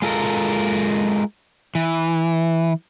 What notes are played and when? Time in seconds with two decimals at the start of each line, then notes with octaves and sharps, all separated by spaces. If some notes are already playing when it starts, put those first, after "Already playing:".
0.02 G#3 F4 A4 A#4
1.75 E3